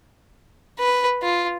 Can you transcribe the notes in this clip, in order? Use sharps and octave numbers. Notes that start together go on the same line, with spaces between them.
B4
F4